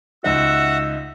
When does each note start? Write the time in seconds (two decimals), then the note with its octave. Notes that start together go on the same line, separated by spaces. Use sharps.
0.24 C#2 D#4 F#4 E5 F#5 E6